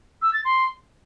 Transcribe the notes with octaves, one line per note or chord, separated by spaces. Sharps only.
E6
A6
C6